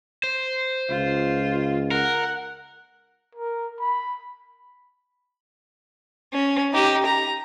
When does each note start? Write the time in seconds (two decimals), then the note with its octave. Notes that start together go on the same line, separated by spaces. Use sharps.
0.24 C5
0.90 C#2 F4
1.91 A#4 F#5
3.35 A#4
3.80 B5
6.33 C#4
6.74 D#4 G4
7.06 A#5